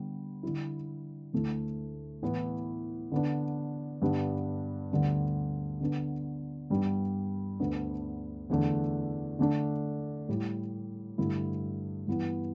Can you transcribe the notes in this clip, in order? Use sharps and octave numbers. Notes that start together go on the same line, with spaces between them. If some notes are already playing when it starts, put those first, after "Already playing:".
Already playing: D3 G3 B3
D3 G3 E4
D2 D3 A3 E4
A2 E3 B3 E4
D3 B3 D4
G2 D3 G3 B3 D4
D2 D3 G3 B3
D3 B3 D4
G2 G3 B3 D4
D2 D3 B3 D4
E2 D3 A3 D4
D3 A3 D4
A2 G3 E4
G2 D3 A3 E4
G2 E3 B3